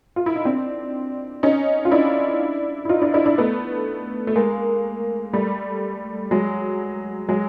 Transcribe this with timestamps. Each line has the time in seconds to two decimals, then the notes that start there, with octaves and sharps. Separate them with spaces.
0.16 F4
0.26 E4
0.36 D#4
0.45 C4 D4
1.43 C#4 D#4
1.85 F4
1.91 D4 E4
2.85 E4
2.89 D#4 F4
3.01 D4 E4
3.14 D4 E4
3.26 D4 E4
3.38 A3 B3
4.27 A3
4.36 G#3 A#3
5.33 G3 A3
6.31 F#3 G#3
7.29 F#3 G#3